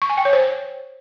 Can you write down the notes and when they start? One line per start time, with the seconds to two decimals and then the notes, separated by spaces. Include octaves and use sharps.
0.02 C#6
0.09 G#5
0.17 G5
0.25 C#5
0.33 C5